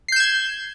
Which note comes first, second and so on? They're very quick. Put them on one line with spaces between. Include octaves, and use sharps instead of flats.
C7 G6 E7 G#6